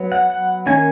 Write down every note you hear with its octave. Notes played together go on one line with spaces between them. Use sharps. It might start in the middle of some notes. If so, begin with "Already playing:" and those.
Already playing: F#3 B3
F#5
F#5
D#3 A#3 C#4 G#5